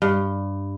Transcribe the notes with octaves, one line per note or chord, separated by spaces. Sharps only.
G2